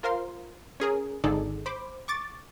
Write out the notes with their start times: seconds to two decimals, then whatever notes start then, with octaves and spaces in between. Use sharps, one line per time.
0.03 F4 A#4 C5 F5 C6
0.80 C#4 G#4 A#4
1.24 G#1 D3 D#4 G#4 A4 D5
1.66 C5 B5 D6
2.08 C#6 D6 A6